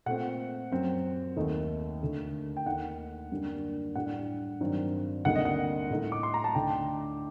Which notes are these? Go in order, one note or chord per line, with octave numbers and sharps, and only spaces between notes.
A#2 A3 C4 F#5
F#2 F#3 C4
D#2 D#3 A3 D#4
D2 D3 A3
G5
D#2 D#3 A3 D#4 F#5
F#2 D3 G3 A#3 D4
A2 G3 D4 F#5
G2 D#3 F#3 C4
D2 C3 G3 A#3 D#4 F#5
D#5
F#5
A2 A3 D#4
D6
C6
A#5
A5
D2 D3 A3 D#4 G5